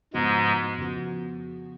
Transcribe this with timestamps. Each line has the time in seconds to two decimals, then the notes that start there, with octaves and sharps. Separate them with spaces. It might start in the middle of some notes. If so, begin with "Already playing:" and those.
0.14 F2 G#2 C#3 F3 G#3 B3 F#4
0.77 F2 C#3 F3 B3 F#4